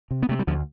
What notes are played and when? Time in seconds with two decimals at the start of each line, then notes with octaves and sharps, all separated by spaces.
0.11 C3
0.23 B3
0.29 C3 A3
0.39 G3
0.47 D2 D3 F3